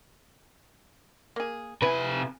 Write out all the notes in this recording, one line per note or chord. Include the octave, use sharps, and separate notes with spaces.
A#3 G#4
C3 E4 B4 G#5